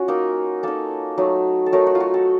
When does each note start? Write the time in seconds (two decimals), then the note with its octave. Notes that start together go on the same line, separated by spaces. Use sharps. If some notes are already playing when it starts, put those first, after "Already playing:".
Already playing: C#4 F4 F#4
0.08 A#3 D#4 A#4
0.63 A#3 D#4 A4
1.18 F#3 A3 D#4
1.66 A4
1.72 F#3 A3 D#4 A#4
1.87 F#4
1.95 F4
2.00 F#4
2.14 A4